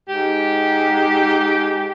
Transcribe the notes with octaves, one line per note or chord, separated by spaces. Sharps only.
G#2 G4